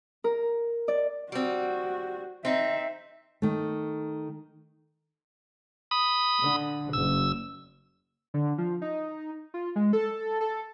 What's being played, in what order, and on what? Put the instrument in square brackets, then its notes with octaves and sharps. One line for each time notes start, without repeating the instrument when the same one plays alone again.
[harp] A#4
D5
[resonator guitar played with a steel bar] G3 C4 [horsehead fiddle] F#4
[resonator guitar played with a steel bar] C4 D#4 [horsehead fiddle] E5
[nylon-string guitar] D#3 A3
[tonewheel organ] B5 D#6
[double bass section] D3
[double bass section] F#1 [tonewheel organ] E6
[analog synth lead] D3
F3
D#4
F4
G#3
A4
A4